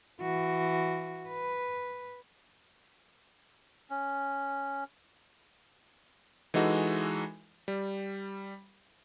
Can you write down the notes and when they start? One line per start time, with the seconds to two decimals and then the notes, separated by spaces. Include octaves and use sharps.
0.21 E3 F#4
1.28 B4
3.90 C#4
6.54 E3 G#3 D#4 F#4 A4
7.68 G3